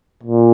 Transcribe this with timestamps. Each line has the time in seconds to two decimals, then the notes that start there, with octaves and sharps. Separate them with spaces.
0.23 A#2